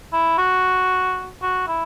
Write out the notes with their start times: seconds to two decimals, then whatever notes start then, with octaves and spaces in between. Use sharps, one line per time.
0.13 E4
0.38 F#4
1.42 F#4
1.68 E4